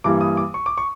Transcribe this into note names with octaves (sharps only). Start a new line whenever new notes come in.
G2 E3 G3 A#3 D6
D#6
D6
C#6
D6
C#6